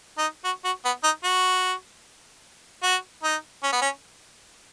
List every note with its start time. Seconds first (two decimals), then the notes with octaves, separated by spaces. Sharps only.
0.18 D#4
0.45 F#4
0.64 F#4
0.85 B3
1.04 D#4
1.24 F#4
2.83 F#4
3.23 D#4
3.63 C#4
3.72 B3
3.82 C#4